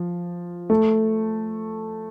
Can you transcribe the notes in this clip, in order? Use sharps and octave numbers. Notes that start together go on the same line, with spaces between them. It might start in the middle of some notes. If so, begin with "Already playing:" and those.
Already playing: F3
A3